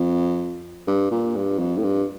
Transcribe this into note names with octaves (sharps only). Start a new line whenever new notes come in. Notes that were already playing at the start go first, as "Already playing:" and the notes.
Already playing: F2
G2
A#2
G2
F2
A2
G2